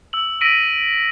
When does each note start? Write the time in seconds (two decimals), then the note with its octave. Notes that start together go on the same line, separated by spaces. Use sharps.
0.13 E6 F#7
0.41 E6 A#6 B6 D7 D#7 F#7